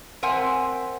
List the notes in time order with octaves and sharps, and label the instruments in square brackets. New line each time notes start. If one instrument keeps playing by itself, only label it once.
[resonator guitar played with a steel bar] C4 A#4 C5 E5 F#5 G#5